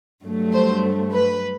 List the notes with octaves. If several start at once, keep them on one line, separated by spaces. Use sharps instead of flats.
G2 F#3 A3
C5
B4